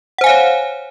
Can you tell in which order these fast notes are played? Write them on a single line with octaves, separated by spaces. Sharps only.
F#5 C5 G#5 F5 C#5